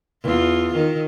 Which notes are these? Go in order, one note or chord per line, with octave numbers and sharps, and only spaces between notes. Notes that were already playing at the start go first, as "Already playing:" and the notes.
E2 F4
D#3